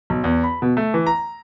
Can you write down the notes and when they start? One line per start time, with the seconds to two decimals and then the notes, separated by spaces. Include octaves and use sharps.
0.10 B1
0.24 E2
0.44 B5
0.62 B2
0.77 A3
0.94 E3
1.06 A#5